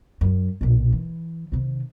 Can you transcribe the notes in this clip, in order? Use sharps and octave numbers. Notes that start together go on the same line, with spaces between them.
F#2
B1 A#2
E3
C3 D#3